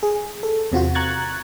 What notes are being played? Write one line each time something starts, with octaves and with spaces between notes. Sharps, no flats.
G#4
A4
E2 C3 F4 F#4
A#5 C#6 F#6 G#6 A6